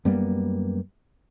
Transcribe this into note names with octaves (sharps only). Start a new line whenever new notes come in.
F#2 G3 A#3 B3